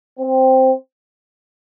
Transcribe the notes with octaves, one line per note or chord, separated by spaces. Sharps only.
C4